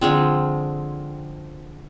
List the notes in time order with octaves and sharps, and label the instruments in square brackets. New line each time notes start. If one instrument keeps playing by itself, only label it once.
[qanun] D3 F3 G#3 C4